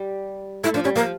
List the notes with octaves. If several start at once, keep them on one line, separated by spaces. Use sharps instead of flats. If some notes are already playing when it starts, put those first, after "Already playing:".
Already playing: G3
A3 E4
F3 D4
G3 C#4
F3 A#3